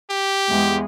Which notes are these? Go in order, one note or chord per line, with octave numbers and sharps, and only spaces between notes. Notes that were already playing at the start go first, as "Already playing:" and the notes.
G4
E2 G#3